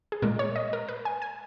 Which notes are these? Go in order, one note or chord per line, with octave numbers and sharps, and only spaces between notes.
G#4
A#2 G#3 A#4
C#5
D#5
A#4
B4
G#5
G#5